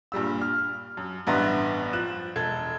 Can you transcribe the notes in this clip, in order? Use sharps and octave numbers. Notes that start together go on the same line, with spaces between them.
G2 A#2 G3 E6
F6
F#2
A1 G2 B3 E5 A#5 C6
F3 F#6 E7
E1 A4 G#6